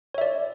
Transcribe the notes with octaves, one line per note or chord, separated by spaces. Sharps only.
C#5 D5 E5